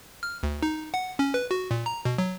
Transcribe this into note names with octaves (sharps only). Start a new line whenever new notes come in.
F6
D2
D#4
F#5
C#4
B4
F#4
A#2
A#5
B2
F#3